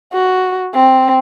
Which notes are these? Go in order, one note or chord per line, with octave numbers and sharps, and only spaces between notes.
F#4
C4